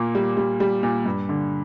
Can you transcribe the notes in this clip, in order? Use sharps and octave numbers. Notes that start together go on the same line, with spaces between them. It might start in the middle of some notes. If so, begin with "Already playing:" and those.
Already playing: A#2 A#3
G3
G3
G3
A#2
G2
D3